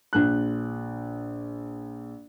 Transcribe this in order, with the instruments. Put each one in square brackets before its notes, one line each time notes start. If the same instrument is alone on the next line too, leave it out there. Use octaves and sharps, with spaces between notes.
[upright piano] A#1 F#6